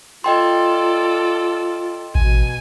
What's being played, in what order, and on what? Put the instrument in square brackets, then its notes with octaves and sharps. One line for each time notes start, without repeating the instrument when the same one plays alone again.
[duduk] F4 [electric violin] A4 D5 [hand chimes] D#5 G5 C6
[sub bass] A1 [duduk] B2 [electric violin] G#5